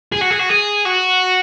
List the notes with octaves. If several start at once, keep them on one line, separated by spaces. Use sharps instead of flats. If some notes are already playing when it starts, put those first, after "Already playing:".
G#4
F#4
G#4
F#4
G#4
F#4